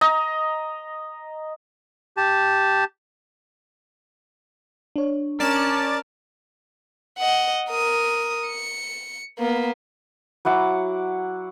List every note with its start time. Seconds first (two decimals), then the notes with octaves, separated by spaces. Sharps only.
0.01 D#5 A#5
2.17 G4 A5
4.96 D4 C#5
5.40 C#4 A#4 D5 A5
7.19 D#5 F#5
7.70 A#4 D#6
8.48 C#7
9.39 A#3 B3
10.45 F#3 E4 F#5 D6